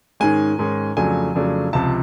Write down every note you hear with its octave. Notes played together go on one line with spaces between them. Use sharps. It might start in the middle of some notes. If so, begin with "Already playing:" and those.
G#2 D#3 G#3 C#4 G#5
G#2 D#3 G#3 C#4
F2 C#3 F#3 A3 D4 G#5
F2 C#3 F#3 A3 D4
C#2 C3 F3 A5